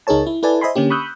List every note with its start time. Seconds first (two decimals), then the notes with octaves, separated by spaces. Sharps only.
0.07 C#2 D#4 G#4 A#4 C#5 A5
0.27 E4
0.43 E4 A4 B4 D5 G#5 A5
0.61 C5 D#5 E5 G#5 B5 C6
0.75 D3 A#3 C#4 G4
0.90 B5 C#6 D#6 E6 F#6 G6